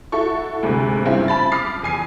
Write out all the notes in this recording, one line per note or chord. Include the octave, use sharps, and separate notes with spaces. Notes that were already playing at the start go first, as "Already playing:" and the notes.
E4 F#4 A4 C#6
D2 G#2 C3
G2 C#3 C4 E4 F4
A5 B5 A6
D6 D#6 F6 B6 C7
E2 G#5 C7